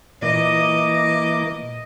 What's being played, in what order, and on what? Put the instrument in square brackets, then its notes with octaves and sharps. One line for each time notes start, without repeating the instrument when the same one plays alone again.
[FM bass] A#2 [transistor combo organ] E3 A#3 D6 [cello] D#5